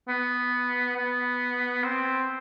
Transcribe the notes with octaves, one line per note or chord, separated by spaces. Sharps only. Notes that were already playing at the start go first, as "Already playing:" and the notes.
B3
B3
C4